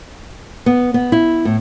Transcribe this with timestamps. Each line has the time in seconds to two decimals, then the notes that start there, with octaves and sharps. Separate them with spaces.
0.66 B3
0.94 B3
1.12 E4
1.45 A2